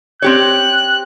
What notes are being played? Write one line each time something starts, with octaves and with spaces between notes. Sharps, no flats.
C4 G4 C#5 F#6